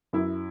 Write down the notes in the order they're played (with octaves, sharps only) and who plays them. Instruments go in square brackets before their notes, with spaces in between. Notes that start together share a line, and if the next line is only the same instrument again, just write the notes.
[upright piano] F#2 E4